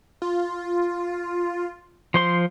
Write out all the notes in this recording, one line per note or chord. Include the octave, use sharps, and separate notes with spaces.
F4
F3 C5 C6